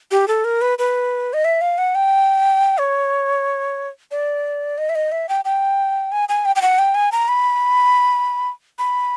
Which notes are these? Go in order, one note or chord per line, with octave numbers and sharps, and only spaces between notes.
G4
A4
A#4
B4
B4
D#5
E5
F5
F#5
G5
C#5
D5
D#5
E5
D#5
E5
G5
G5
G#5
G#5
G5
G5
F#5
G5
G#5
A#5
B5
B5